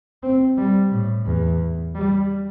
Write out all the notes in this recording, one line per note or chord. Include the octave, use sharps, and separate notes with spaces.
C4
G3
A2
E2
G3